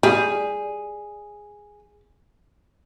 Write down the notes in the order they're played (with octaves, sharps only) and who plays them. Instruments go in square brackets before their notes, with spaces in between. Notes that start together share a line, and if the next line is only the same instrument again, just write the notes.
[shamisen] G3 [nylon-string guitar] G#4